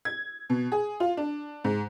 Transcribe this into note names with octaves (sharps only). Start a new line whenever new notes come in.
G#6
B2
G#4
F4
D4
G#2